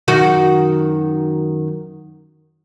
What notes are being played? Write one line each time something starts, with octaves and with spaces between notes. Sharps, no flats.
F#2 D#3 F#4